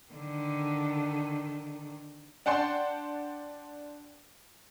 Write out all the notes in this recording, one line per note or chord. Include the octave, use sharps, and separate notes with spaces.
D3 D#3
D4 F#5 G5 A5 C6